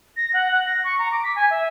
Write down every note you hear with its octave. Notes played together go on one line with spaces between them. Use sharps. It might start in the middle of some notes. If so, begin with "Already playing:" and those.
A#6
F#5
F#5
A#6
C#6
A#5
D6
B6
G#5
E5